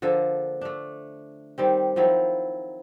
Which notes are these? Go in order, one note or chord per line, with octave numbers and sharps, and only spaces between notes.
D3 F3 A#3 A4
A3 D4
D#3 G3 C4
D#3 F3 F#3 E4